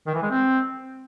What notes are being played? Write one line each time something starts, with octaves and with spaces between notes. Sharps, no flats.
D#3
E3
G#3
C4